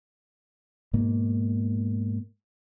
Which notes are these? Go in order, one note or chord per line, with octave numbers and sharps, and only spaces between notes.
G#2 B2 A#3